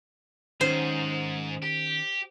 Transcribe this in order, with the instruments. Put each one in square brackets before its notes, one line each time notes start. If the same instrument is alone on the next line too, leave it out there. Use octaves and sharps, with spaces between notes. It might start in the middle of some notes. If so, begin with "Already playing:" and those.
[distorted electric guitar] G#2 G#4 [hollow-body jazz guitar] D#3 C#4 [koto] C5
[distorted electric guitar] G4